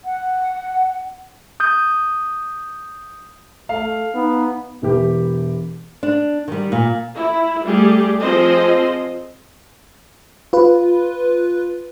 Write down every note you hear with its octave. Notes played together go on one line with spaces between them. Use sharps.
F#5
D#6 G6
A3 F5
B3 D#4
E1 E3 G4
D4
D#3 G3
A#2
E4
G3 A3 G4 G#4
F3 C4 G#4 C5 D#5
F4 B4